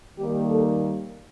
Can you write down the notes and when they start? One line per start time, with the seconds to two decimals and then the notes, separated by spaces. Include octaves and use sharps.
0.18 D#2 D#3 G3 A#3 G4
0.47 A4